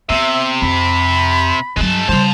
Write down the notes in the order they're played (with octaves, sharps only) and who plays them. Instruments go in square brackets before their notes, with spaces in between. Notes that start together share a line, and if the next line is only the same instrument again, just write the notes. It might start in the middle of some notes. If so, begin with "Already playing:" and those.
[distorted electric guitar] C3 [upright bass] B3 [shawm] E5
[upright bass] F2 [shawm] B5
[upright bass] G2 F#3 [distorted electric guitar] G#3 A5
[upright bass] C#3 G3 [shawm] C5 [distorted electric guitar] A5 C6